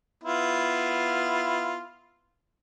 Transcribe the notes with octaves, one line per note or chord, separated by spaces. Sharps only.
B3 E4 F4